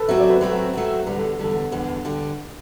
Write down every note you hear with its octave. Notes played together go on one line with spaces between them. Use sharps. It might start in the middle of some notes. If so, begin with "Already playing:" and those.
Already playing: A4 B4
F#3 A3 C4 F#4 E5
D5
B4
F#3 A3 C4 F#4 B4
F#3 A3 C4 F#4
E2 D3 G3 B4
A4
E2 D3 G3 A4
E2 D3 G3 B4
D3 G3